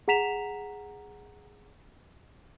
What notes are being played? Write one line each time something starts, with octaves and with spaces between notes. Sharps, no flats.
G#4 F#5 A#5 B6 E7 F7